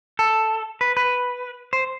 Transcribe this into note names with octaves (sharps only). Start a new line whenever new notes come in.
A4
B4
B4
C5